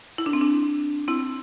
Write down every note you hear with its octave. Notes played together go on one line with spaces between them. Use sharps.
E4
D4
C4
D4
C4 E4